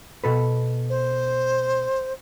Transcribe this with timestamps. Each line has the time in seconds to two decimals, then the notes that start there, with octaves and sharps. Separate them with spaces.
0.24 B2 A4 B4
0.89 C5